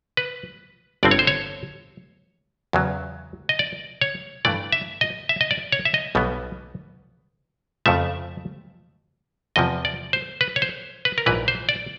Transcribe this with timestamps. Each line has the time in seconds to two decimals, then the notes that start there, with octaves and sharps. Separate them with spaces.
0.17 B4
1.03 G1 G2 D3 G3 C4 D5
1.11 C#5
1.19 C5
1.27 C#5
2.73 E2 C#3 F#3
3.49 D#5
3.59 D5
4.01 C#5
4.45 G2 E3 A3 D5
4.72 E5
5.01 D#5
5.29 E5
5.41 D#5
5.51 D5
5.72 C#5
5.85 E5
5.94 D#5
6.15 B1 B2 G3 B3
7.86 F2 C#3 F3 A3 E5
9.56 E2 C3 F3 D#5
9.85 D5
10.13 C5
10.41 B4
10.56 C#5
10.62 C5
11.05 B4
11.18 A#4
11.26 A#1 G#2 E3 B4
11.48 C5
11.69 D5